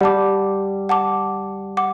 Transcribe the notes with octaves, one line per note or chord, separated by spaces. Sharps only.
G3 F#5 A5 D6
F#5 A5 D6
F#5 D6